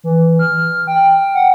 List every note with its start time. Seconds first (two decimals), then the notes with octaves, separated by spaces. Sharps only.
0.04 E3
0.39 F6
0.87 G5
1.34 F#5